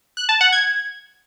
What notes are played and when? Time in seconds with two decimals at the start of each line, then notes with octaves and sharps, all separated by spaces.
0.17 F#6
0.29 A5
0.41 F#5
0.52 G#6